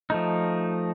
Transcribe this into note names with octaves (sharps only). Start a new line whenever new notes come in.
F3 A3 D#4